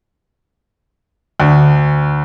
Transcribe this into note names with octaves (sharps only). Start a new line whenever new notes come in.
D2